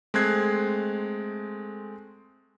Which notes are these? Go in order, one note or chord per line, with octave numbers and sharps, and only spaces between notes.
G#3 A3 C4 F#6 G#6 C7